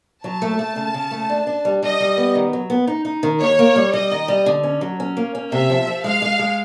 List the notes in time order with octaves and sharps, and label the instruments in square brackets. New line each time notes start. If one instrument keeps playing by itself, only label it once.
[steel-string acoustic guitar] F#3 [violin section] A5
[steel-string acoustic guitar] A3
A3
C#3
C#3
A3
D4
D4
G3
[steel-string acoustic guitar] G3 [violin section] D#5
[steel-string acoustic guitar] G3
B3
D#3
F#3
B3
D#4
D#4
D#3
[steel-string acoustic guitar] D#2 [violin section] C#5
[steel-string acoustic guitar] A#3
G3
[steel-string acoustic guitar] G3 [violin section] D#5
[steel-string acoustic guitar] D#3
G3
D3
C#4
F#3
C#4
A#3
C#4
[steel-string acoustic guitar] C3 [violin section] E5
[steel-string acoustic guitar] F3
F3
[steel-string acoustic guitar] G#3 [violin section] F5
[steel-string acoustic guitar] G#3
G#3